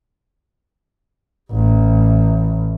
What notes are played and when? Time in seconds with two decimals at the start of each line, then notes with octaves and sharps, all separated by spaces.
1.51 A1